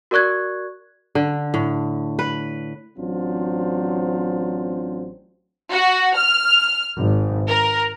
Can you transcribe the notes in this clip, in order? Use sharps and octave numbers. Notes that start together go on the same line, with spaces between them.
F#4 A#4 D5 C#6 F#6 G#6
D3
A2
B4
A1 F#3 C4 D4 F4 C5
F#4
F6
G#1
A#4